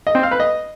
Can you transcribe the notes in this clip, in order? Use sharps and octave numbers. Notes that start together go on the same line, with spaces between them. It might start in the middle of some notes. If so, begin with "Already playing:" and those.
D#5
C4
F5
B4
D#5